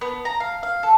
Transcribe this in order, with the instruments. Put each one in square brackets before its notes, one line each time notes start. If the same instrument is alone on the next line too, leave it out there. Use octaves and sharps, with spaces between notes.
[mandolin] B3
A#5
F5
F5
A4